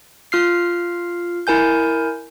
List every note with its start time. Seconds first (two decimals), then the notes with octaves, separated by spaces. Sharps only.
0.32 F4 F6 C7
1.47 E4 A#4 G#5 G6